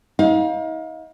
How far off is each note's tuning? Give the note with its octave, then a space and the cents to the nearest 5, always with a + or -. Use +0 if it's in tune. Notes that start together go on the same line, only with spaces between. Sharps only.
D#4 +40 F5 +30